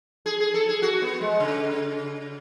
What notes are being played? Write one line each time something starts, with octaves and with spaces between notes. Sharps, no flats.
G#4
G#4
A4
G#4
F#4
B3
G#3
C#3